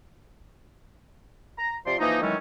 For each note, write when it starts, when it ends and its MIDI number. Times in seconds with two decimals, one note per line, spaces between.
1.58 1.75 82
1.86 1.96 48
1.86 1.96 53
1.86 1.96 65
1.86 1.96 74
1.86 1.96 84
1.99 2.22 52
1.99 2.22 53
1.99 2.22 58
1.99 2.22 63
2.22 2.35 51
2.22 2.35 52
2.22 2.35 54
2.22 2.35 56
2.22 2.35 57
2.22 2.35 61